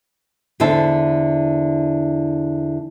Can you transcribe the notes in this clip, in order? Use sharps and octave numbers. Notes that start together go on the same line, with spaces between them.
E2 D3 E4 C5 E5 A5